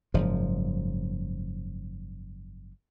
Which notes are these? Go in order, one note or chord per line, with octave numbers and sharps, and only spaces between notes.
F#1 G#2 F3